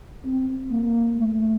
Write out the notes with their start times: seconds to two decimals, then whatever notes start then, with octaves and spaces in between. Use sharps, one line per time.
0.25 C4
0.71 A#3
1.17 A3